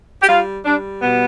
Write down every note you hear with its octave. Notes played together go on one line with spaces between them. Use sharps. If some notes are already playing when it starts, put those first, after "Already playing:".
G4
G3 F4
G3 D4
B2 B3